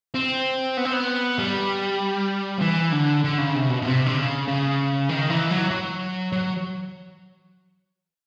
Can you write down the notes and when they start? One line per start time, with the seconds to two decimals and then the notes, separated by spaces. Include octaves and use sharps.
0.14 C4
0.77 B3
0.85 C4
0.93 B3
1.39 G3
2.58 F3
2.62 E3
2.93 D3
3.24 D3
3.39 C#3
3.55 C3
3.70 B2
3.82 B2
3.85 C3
4.06 D3
4.17 C#3
4.48 C#3
5.09 D#3
5.30 E3
5.51 F#3
5.71 F#3
6.33 F#3